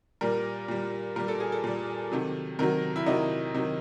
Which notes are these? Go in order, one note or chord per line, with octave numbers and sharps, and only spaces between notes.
A#2 G3 A#4
A#2 G3
A#2 G3 A#4
A4
G#4
A4
A#2 G3
C3 D#3 F#3
C3 D#3 F#3 A#4
E4
C3 D#3 F#3 D#4
C3 D#3 F#3